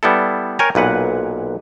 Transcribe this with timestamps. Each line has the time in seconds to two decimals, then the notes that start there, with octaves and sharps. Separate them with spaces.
0.03 G3 B3 E4 A4
0.59 A#4 C#5 G5 G#5 A#5
0.75 B1 A#2 B4 F#5